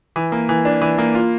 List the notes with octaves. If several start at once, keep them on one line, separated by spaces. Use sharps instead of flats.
E3
A#3
E3
D4
E3
A#3
F4